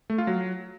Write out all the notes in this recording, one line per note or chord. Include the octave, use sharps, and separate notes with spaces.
A3
F4
F#3